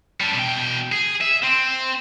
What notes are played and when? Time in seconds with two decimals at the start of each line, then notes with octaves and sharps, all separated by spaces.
0.21 G3 D4
0.35 B2 G5
0.92 G#4
1.21 E5
1.43 C4